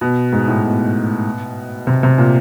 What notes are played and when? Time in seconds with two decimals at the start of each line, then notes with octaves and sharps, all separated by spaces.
0.01 B2
0.33 G#2
0.48 A2
0.63 B2
1.87 C3
2.03 C3
2.18 A#2